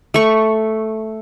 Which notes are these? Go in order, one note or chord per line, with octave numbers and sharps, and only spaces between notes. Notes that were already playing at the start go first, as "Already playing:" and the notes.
A3 C#6